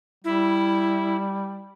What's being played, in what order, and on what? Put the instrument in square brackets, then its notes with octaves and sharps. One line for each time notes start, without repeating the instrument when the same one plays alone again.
[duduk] G3 [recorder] E4